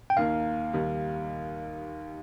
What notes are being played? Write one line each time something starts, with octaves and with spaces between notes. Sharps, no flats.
G5
D#2 D#3 A#3 F5
D#2 D#3 G3